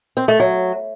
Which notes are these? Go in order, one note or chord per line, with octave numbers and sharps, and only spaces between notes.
C4
A3
F#3